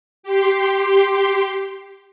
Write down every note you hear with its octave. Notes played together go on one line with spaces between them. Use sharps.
G4 C6